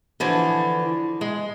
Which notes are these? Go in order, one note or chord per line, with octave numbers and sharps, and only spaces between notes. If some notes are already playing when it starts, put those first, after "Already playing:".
D3 E3 F3
G#3